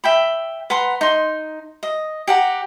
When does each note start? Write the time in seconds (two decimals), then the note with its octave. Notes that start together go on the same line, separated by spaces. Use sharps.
0.04 E5 G5 B5
0.70 B4 F#5 A#5 C6
1.01 D#4 C6
1.83 D#5
2.27 G4 F#5 A#5